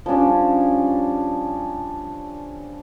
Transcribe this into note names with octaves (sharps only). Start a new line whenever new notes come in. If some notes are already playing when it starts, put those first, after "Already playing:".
F3 G3 C#4 D4